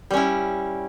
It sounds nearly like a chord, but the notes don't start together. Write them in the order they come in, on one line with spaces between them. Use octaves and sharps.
G3 C#4 E4